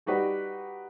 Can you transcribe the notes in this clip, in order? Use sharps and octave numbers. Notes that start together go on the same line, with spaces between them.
G3 D#4 F#4 G4 B4 D5